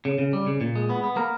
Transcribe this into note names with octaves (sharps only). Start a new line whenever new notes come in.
C#3
C#3
G3
C#3
A#2
G#3
B3
B3
A#3 A#4